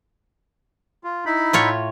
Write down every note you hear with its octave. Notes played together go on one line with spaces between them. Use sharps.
F4
D#4 E4 B5
A2 F4 C#5